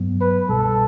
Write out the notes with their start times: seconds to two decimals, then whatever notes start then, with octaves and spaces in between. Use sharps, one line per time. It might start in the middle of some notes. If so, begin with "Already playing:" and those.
Already playing: G2 F#3 B3
0.21 B4
0.49 C2 B2 G3 A4